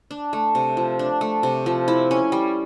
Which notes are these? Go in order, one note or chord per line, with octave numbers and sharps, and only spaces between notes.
D4
A3
C3
F3
D4
A3
C3
F3
E4
C#4
G3